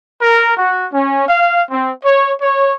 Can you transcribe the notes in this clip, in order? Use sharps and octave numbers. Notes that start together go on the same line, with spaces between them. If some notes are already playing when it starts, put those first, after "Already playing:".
A#4
F#4
C#4
F5
C4
C#5
C#5